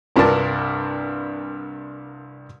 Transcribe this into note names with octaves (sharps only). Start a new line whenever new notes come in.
C2 G2 D4 A#4 A5